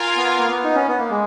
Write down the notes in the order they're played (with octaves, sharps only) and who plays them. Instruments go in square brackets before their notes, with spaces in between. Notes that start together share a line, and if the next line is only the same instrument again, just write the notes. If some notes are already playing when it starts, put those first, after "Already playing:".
Already playing: [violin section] F4 A#4 F5 G#5
[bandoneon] B3
A#3
B3
D#4
C#4
B3
A#3
G#3